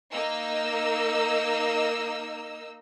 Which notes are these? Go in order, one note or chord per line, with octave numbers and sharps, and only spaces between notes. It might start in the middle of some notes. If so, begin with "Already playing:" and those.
A#3 D#4 D#5 E6